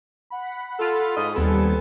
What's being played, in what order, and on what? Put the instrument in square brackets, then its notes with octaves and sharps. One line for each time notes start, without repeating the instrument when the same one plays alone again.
[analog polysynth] F#5 B5
[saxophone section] F4 A4
G#2 F4 D#5
[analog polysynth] D#2 G3 G#5 [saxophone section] B3 C4 A4